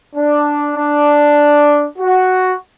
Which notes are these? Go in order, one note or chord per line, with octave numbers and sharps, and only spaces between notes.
D4
D4
F#4